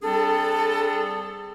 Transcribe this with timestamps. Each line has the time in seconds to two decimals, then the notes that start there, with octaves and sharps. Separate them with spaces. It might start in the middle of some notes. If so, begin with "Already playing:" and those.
0.02 G3 C4 D4 G#4 A4